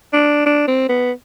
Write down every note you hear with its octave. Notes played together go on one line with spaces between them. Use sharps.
D4
D4
C4
B3